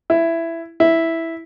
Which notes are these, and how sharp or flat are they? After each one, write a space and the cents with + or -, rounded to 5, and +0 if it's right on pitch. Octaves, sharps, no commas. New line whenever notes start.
E4 +10
E4 -5